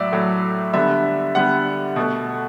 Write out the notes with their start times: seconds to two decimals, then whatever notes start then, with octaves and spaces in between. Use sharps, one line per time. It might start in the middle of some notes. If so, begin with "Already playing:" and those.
Already playing: A2 F#3 D5 E5
0.12 A2 F#3 A3
0.74 D3 G3 B3 E5
1.35 D3 G3 B3 F#5
1.96 B2 A3